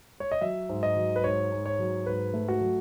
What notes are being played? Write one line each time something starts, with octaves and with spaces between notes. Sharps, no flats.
C#5
D#5
F#3 E5
G#2
D#5
F#3
B4
G#2 C#5
G#2
C#5
F#3
G#2 B4
A3
F#4
F#3